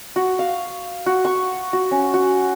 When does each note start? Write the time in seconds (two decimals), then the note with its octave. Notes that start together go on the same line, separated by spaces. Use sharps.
0.16 F#4
0.39 F5
1.06 F#4
1.25 C#6
1.73 F#4
1.91 C#4
2.14 F#4